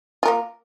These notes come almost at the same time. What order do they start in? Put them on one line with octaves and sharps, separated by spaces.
F4 A#4 A#3